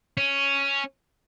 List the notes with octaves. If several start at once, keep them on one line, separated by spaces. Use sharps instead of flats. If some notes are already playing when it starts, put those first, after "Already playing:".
C#4